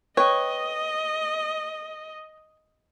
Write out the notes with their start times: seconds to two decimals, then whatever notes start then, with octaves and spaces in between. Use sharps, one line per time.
0.17 B4 C#5 D#5 G5